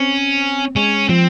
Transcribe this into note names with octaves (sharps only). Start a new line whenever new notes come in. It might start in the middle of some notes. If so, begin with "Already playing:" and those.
Already playing: C4 C#4
G#3 C#4
F3 C4